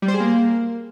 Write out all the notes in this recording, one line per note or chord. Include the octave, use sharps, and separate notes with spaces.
G3
C5
G#4
A#3